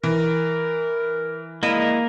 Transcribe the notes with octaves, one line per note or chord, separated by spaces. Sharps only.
E3 A#4
C#3 F3 G#3 A#3 E4 A#4 D#5